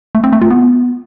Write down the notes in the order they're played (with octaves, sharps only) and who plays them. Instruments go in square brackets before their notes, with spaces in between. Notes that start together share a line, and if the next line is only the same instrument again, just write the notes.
[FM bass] A3
C4
A3
F4
B3